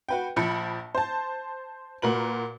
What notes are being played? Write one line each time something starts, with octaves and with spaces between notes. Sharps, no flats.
F#4 B4 G5
A#1 F3 B5 C#7
C5 A5
A#2 F#4 A#4 B4 F#7